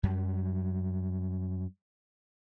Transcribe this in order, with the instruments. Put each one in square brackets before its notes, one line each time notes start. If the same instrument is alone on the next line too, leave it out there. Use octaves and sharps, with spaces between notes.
[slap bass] F#2 F#3 G3